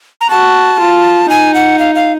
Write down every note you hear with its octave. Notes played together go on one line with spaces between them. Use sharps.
A#5
F#4 A5
F4
D#4 G#5
F#5
F5
F5